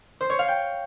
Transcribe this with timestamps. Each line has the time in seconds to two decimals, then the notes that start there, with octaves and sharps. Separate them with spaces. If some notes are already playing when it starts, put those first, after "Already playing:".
0.21 C5
0.30 C#5
0.39 F5
0.48 G5